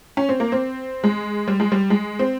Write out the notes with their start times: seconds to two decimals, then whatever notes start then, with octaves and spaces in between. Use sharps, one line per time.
0.17 C#4
0.29 C4
0.40 A#3
0.52 C4
1.04 G#3
1.48 G3
1.60 G#3
1.72 G3
1.90 G#3
2.19 C4